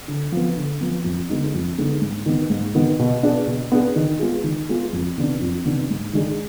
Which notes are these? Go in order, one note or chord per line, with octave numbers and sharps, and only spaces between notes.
D3
F3 B3
D3
F3 B3
F2
D3 G#3 B3 D#4
F2
D3 G#3 B3 D#4
G#2
D#3 B3
G#2
D#3 B3
B2
B3 D4 G#4
B2
B3 D4 G#4
D#3
G#3 B3 F4 G#4
D#3
G#3 B3 F4 G#4
F2
C3 D#3 B3 D4
F2
C3 D#3 B3 D4
G#2
D#3 G#3 D4 G#4